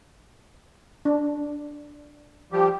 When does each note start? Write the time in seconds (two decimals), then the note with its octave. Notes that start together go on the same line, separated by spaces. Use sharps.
1.05 D4
2.52 F3 G3 G4